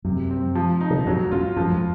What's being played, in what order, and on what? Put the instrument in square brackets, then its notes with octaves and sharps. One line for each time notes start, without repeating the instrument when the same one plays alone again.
[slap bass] F#2 [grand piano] C3
[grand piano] C4
F3
D#4
[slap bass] C3
A#2
[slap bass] F2 G#2 [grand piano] F#3
[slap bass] F#2 [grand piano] F4
[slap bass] F#2 [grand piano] F3
[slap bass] F2